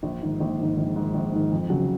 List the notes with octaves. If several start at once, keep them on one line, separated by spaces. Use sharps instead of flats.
A#1
G#2 D#3
A#1
G#2 D#3
A#1
G#2 D#3
A#1
G#2 D#3
F2
C#3 F#3